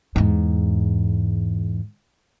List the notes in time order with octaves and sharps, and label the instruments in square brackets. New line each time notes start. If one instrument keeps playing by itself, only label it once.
[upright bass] E2 G#2